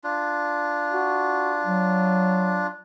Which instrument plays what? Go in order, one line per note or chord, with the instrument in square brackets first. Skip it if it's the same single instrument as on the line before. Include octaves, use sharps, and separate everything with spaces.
[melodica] D4 F4
[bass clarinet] F#4
F#3